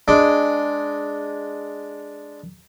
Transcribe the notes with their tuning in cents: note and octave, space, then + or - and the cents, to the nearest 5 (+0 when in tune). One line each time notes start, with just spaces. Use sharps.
G#3 +0 D4 +0